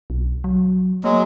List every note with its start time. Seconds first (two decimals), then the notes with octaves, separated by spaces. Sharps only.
0.10 B1
0.44 F#3
1.04 F#3 G#3 A#3